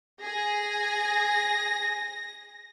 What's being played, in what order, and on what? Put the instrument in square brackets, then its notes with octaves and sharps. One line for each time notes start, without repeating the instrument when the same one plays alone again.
[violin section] G#4 G#5 [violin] A#6